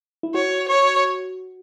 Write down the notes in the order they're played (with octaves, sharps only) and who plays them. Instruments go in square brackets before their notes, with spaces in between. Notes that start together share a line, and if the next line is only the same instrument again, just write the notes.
[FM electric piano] E4
[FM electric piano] F#4 [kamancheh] C#5
[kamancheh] C#5